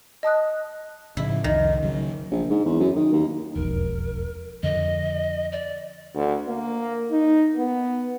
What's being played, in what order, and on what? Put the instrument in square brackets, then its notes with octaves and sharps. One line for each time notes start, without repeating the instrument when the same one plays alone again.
[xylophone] D#5 A5 D#6 F#6
[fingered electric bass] A2 C#3 F3 [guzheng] E4
[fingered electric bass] C2 F2 [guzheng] D#3
[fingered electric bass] C#3 F#3
[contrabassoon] A#1
G#2
E2
F#2
D#3
D#2
[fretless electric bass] E1 B1 F2 [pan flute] A#4
[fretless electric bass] F2 D3 [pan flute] D#5
[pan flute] D5
[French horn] D2
A#3
D#4
B3